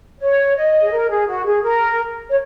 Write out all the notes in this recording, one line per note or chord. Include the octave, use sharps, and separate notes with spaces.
C#5
D#5
G#4
A#4
G#4
F#4
G#4
A#4
C#5